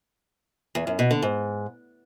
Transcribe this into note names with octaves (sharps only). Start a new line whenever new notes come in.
E2
F#2
B2
D3
G#2